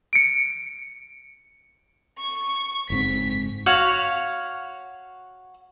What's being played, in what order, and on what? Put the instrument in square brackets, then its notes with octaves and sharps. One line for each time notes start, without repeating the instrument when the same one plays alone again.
[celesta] C#7 D7
[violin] C#6
[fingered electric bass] F#1 G#2 C4 [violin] B6
[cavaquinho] F#4 C#5 F5